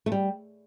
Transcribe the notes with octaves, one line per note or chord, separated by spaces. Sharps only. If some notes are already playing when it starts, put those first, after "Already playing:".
A3
G3